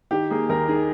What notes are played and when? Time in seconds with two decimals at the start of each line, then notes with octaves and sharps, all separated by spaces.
0.11 D#3 G4
0.30 A#3 G#4
0.49 D#2 A#4
0.68 D#3 G#4